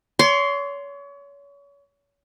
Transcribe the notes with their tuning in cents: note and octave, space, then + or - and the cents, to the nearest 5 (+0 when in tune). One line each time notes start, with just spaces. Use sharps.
C#5 +35 C6 +0